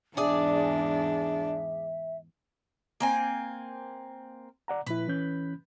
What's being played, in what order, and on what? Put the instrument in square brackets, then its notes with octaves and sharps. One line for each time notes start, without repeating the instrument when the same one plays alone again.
[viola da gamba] E2 G#2 [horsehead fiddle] D4 [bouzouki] G#4 D5 [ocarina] E5
[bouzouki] A#3 C4 G#5
[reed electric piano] D5 F#5 A#5
[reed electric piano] A#2 F3 E4 [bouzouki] B4
[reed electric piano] E3 C#4 G6